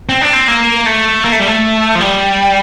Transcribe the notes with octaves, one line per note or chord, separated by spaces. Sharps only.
C4
D4
C4
A#3
A3
A#3
A3
G3
A3
F3
G3